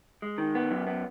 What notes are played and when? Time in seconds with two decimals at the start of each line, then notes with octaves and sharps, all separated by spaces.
0.22 G#3
0.38 D#3
0.55 B3
0.71 F#2
0.87 B3